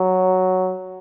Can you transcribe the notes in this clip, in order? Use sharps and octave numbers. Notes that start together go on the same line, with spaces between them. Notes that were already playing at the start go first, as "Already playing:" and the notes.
Already playing: F#3